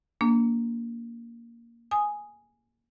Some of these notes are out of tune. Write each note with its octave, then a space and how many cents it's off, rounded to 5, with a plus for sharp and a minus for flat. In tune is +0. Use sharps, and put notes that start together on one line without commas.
A#3 +0 D4 -30
G#5 +0 D#6 +0